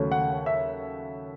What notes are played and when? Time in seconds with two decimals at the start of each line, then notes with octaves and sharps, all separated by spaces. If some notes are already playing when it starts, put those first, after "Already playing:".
Already playing: D#2 C#3 F#3 A3 C#4
0.12 F#5
0.46 E5